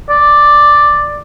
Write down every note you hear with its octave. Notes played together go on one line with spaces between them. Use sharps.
D5